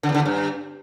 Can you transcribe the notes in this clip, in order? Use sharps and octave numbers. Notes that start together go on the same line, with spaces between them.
D3
E2
D3
E2
G2